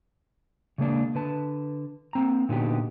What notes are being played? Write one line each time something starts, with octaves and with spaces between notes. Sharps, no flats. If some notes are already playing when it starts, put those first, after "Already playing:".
C#3 G#3 A#3 D4
D3 B4 A5
A#3 C4 A#5
A#2 D3 B3 D#4 F#4 G4